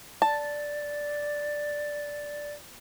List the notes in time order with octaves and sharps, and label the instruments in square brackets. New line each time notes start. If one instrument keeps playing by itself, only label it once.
[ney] D5 [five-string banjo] A5